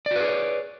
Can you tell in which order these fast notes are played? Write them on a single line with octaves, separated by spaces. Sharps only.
D5 F#4 B4 G#4 C#5